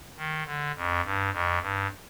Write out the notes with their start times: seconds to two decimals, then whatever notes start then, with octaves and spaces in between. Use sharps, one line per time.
0.17 D#3
0.45 D3
0.75 F2
1.04 G2
1.32 F2
1.61 G2